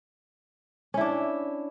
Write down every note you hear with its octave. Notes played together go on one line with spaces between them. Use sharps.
C#4 D4 E4